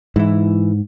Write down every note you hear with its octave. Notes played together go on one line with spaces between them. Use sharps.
G#2 E3 E4